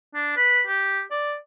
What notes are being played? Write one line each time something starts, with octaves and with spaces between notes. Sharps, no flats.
D4
B4
G4
D5